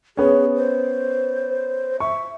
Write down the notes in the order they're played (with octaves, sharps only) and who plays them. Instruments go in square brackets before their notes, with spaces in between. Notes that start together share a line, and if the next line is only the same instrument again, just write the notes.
[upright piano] B3 C#4 [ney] G#4
[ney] C5
[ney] E5 [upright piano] C#6